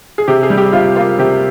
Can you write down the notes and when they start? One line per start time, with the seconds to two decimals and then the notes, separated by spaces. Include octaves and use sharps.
0.18 G#4
0.28 C3 G4
0.43 G#4
0.50 G3
0.58 G4
0.73 C3 F4
0.96 A#3 F4
1.19 C3 G4